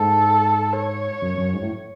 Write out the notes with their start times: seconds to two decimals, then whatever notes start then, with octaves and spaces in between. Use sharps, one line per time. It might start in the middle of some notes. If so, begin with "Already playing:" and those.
Already playing: G#2 A4
0.73 C#5
1.22 F#2
1.38 F#2
1.54 G#2
1.62 A2